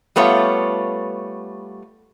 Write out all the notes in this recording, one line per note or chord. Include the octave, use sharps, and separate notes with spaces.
G3 A3 B3 F4 C#5